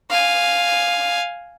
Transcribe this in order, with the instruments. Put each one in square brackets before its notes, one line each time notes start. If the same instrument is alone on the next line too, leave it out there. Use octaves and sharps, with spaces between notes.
[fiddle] F5 G#5